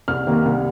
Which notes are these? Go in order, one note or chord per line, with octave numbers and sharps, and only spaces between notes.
C2 F6
C3 D#3 A#3
C2